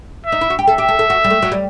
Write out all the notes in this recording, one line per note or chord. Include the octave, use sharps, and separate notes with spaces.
E5
D#4
E4
F#4
G4
A4 E5
G4
A4
A4
F#4
G3
A3
F#3
G3